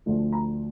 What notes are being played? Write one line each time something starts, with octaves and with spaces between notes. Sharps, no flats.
D2 D3 F3 A3
A#5